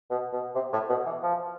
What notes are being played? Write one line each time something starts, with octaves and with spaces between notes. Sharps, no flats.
B2
B2
C3
A2
B2
E3
F3